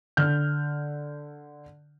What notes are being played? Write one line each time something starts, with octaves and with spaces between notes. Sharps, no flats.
D3 F6 G6